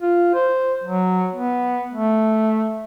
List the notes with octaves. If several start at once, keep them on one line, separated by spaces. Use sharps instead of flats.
F4
C5
F#3
B3
A3